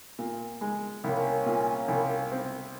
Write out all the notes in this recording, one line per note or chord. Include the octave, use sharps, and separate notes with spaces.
A#2
G#3
C2 A#3 C#4
A#2
C2
C4